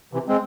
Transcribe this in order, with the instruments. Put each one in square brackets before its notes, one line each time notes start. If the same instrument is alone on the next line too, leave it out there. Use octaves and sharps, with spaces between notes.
[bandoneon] C3 E3
G#3 C4